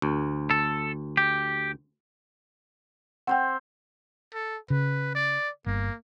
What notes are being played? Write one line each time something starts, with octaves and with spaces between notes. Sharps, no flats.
D2
A4
G4
C4 C5 F#5 G5
A4
C#3 B4
D5
G1 A#3